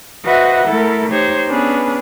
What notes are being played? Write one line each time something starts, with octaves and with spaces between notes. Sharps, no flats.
F#4 B4 C5 D#5 E5 F#5
A3 E4 A4 A#4
D#4 G4 C5 C#5
B3 C#4 D4 G#4 B4